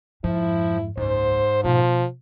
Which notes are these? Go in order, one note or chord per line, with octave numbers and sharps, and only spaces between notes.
F2 G#2 F3 E4
F#1 C#2 G#2 C5
B2 F3 B3